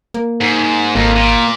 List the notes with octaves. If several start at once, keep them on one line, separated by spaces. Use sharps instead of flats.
A#3
G#2
G#1 F2 A#3
A#2